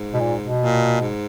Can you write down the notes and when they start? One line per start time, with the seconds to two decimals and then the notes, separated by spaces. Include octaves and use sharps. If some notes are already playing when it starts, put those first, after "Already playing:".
Already playing: G#2
0.14 B2
0.21 A#2
0.41 B2
0.60 A#2
1.00 G#2